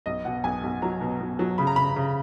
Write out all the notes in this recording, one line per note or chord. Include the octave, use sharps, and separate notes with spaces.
B1 D#5
B2 F#5
B1 G#5
B1
F#3 A#5
B2
B2
F#3
C#3 B5
A#5
C#3 B5
C#3